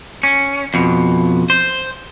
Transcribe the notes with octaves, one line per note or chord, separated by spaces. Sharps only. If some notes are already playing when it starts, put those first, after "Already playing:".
C#4
F2 B2
C5